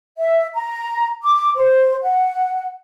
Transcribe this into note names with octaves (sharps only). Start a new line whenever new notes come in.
E5
A#5
D6
C5
F#5